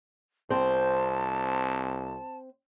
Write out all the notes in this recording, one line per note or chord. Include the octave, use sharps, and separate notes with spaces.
C2 C4 C5 A5